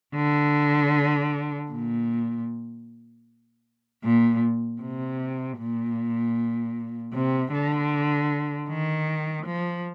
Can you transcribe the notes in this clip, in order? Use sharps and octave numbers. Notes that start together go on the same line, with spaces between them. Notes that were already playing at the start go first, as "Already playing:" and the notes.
D3
A#2
A#2
C3
A#2
C3
D3
D#3
F3